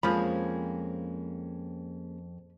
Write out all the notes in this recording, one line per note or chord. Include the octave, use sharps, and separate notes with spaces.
F2 F3 G#3 A#3 C#4 G#4 B5